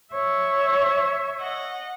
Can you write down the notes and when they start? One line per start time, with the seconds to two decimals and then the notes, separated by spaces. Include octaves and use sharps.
0.12 C#5 E5
1.38 D#5 F#5